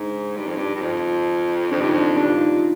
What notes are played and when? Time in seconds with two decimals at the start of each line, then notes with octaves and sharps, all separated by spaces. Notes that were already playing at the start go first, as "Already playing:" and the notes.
Already playing: G#2 D4 D#4
0.37 G2
0.47 F2
0.57 G2
0.75 G2
0.82 F2 F4
1.71 F2 D4
1.80 G2 D#4
1.90 F2 D4
2.17 G2 D4
2.29 F4
2.39 D#4